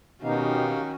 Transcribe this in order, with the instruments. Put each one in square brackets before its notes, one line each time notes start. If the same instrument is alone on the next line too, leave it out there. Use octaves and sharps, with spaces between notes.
[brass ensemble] B2 D#4 [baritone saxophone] D#3 [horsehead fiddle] C#4 F#4 [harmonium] G4 F5